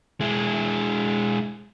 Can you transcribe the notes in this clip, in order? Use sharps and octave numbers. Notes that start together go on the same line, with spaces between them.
G#3 E4